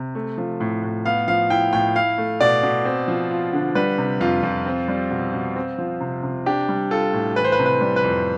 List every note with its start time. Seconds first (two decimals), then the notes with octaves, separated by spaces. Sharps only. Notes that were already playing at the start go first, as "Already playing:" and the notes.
Already playing: C3
0.15 A3
0.38 F3
0.60 A2
0.83 A2
1.05 B3 F5
1.28 F3 F5
1.50 E4 G5
1.73 A2 G5
1.95 E4 F5
2.18 A3
2.41 B2 D5
2.63 B2
2.85 C4
3.08 F3
3.31 F4
3.53 D3
3.75 G3 B4
3.98 C3
4.21 F2 F4
4.43 F2
4.66 C4
4.88 G3
5.11 B2
5.33 B2
5.56 C4
5.78 F3
6.00 C3
6.23 C3
6.46 D4 G4
6.69 G3
6.91 F4 A4
7.13 A2
7.36 E3 B4
7.44 C5
7.52 B4
7.59 C3
7.66 B4
7.81 G3
7.96 B4
8.04 F2